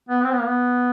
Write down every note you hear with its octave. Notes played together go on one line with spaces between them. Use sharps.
B3
C4
B3
A#3
B3